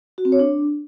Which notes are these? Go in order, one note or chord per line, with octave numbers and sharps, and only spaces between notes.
F#4
C4
C#5
D4